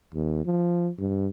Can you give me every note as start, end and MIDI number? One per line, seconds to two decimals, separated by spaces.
0.14 0.43 39
0.45 0.90 53
0.98 1.29 43